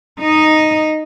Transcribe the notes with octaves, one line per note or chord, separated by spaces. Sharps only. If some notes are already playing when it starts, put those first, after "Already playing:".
D#4 D#5